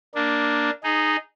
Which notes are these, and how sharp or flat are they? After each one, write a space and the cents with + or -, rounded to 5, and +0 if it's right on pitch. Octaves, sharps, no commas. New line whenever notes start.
A#3 +0 D4 +0
D#4 -10 G#4 +0